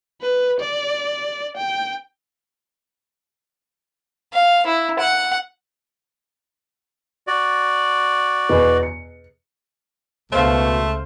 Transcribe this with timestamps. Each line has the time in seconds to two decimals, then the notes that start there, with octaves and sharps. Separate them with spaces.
0.21 B4
0.60 D5
1.57 G5
4.34 F5
4.66 E4
4.99 F#5
7.27 F#4 D5
8.49 E2 B2 B3
8.83 C#7
10.32 C#2 B2 A3 C5 F5